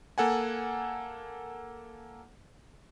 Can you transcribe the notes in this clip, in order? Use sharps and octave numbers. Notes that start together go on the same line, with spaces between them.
A#3 A4 F#5 G#5